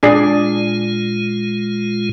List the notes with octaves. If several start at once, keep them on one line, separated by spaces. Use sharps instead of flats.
A#2 G#3 D4 F4 G#4 D5